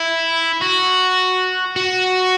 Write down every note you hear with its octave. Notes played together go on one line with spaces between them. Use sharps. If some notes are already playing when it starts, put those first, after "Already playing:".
Already playing: E4
F#4
F#4